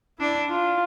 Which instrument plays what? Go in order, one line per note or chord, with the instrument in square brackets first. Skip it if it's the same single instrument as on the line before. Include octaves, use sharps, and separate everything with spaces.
[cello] D4 [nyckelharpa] E4
[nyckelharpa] F4